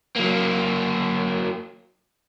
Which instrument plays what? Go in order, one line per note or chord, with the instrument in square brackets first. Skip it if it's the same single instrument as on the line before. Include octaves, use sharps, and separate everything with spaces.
[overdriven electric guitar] F#3 A#3